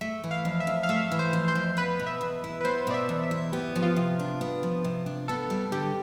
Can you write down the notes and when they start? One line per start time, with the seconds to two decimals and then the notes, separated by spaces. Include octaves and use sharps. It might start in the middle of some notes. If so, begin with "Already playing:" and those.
0.01 A3 E5
0.24 E3
0.31 F5
0.45 F2
0.60 E5
0.67 F2
0.83 F5
0.89 A3 E5
1.12 E3
1.19 C5
1.33 F2
1.48 C5
1.55 F2
1.77 B3 B4
2.00 B2
2.06 E5
2.21 E2
2.44 E4
2.61 B4
2.65 B3 C5
2.87 B2 D5
2.94 E5
3.09 E2
3.24 E5
3.31 E4
3.52 B3 G4
3.76 F3
3.82 F4
3.96 C3
4.19 D4
4.41 B3
4.63 F3
4.84 C3
5.06 D4
5.28 B3 A4
5.50 G3
5.72 D3 G4